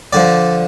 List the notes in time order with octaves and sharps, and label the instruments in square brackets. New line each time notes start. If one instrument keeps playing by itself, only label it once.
[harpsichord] D3 F3 D5